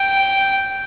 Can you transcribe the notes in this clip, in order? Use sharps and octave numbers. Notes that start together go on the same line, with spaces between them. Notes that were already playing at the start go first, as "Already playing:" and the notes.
Already playing: G5